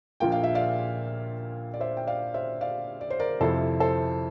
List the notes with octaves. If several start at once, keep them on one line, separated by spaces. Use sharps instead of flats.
A#1 A#2 F3 A#3 F4 G5
F5
E5
D5 F5
D5
C5 E5
G5
D5 F5
C5 E5
D5 F5
D5
C5
A#4 D5
F2 C3 F3 C4 E4 A4 C5
A4 C5